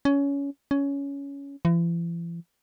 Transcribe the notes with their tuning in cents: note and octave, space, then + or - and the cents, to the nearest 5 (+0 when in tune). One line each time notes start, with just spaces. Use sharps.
C#4 +20
C#4 +15
E3 +45